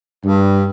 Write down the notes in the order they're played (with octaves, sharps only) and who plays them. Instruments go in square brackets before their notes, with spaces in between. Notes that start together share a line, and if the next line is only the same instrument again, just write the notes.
[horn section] G2